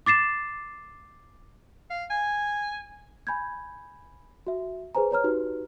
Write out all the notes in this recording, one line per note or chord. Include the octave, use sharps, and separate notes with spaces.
D6 A6 C7 E7
F5
G#5
G#5 B5 G6 G#6
F#4 E5
G#4 B4 C5 G#5 A#5
B4 C#5 A#5 F6
D#4 F#4 G4 B4